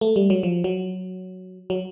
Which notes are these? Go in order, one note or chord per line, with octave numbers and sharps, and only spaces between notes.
A3
G3
F#3
F3
F#3
F#3